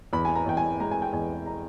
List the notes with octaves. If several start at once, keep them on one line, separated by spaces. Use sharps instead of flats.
E2 B5
G#5
A#5
E2 G5
G#5
G#3 A#5
G#5
G5
E2 G#5
A#5